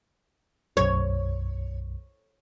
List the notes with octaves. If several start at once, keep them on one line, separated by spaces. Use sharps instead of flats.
B1 F#2 C#5